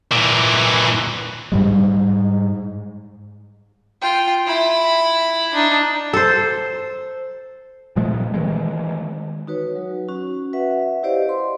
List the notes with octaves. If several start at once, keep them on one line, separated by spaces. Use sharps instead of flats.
A#2 E3
G#2 G3 G#3
F4 G5
E4 B5
D4 D#4
A4 C5
A#2 F3 G#3 A3
D#3 E3 G#3
D#4 F#4 B4 C#5
F#3
C#4 F#4
B4 E5 F#5
E4 G4 C5 D5 D#5 F5
C6